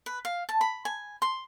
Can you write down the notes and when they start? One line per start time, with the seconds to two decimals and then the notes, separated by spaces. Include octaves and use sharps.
0.06 B4
0.25 F5
0.49 A5
0.61 B5
0.85 G#5
1.22 C6